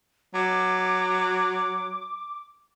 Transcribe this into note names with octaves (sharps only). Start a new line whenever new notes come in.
F#3 D6